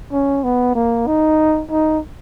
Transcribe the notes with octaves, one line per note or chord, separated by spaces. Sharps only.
C#4
B3
A#3
D#4
D#4